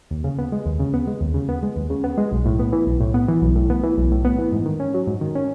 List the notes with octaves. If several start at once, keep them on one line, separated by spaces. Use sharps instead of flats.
D#2
C#3
B3
G#3
D#2
C#3
B3
G#3
D#2
C#3
B3
G#3
D#2
C#3
B3
G#3
B1
A2
B3
E3
B1
A2
B3
E3
B1
A2
B3
E3
B1
A2
B3
E3
G#2
D#3
C#4
F#3
G#2
D#3
C#4